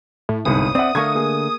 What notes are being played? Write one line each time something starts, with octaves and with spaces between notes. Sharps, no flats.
A2
G1 C2 G#2 D#6
C4 D5 E5 F#5
D3 A3 A#4 F5 C#6 G#6
A#3 G#4